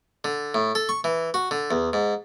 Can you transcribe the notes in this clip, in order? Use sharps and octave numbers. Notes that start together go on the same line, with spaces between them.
D3
A2
A4
C#6
E3
F#4
D3
E2
G#2